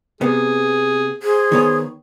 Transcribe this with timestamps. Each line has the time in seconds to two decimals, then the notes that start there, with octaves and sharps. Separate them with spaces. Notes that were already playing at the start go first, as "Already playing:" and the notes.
0.21 C3 B3 G#4
1.23 G#4 C5
1.52 D#3 B3 C#5